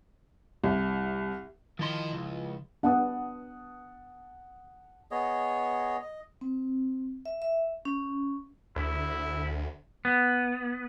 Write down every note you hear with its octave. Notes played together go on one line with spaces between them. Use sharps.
C2
D#3 F3 E4 D#5 C6
C#2
B3 D4 F#5 A5 D#6
B3 G#4 C#5 D#5
D#5
C4
E5
E5
C#4
D2 E4
B3